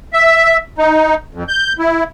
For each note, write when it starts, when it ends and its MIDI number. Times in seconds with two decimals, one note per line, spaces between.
0.13 0.57 76
0.78 1.15 63
1.34 1.44 41
1.48 1.73 91
1.79 2.04 64